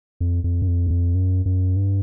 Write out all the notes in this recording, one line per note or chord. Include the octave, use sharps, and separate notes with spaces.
F2
F2
F#2
F2
E2
F2
F#2
F#2
G2